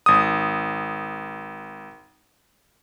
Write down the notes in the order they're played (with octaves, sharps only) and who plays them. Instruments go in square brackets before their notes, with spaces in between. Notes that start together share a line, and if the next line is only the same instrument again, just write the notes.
[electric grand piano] G#1 D#6